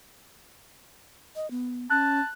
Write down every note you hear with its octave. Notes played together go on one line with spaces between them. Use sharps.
D#5
B3
C#4 A5 F#6